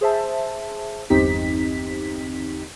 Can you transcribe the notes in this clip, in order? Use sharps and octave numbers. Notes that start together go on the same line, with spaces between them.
G#4 C5 E5 A5
G1 E2 C4 D#4 G4 B6